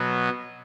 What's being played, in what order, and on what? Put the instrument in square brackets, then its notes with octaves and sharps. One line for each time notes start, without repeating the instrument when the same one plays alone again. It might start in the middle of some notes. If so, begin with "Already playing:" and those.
Already playing: [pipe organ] B2 F#3 B3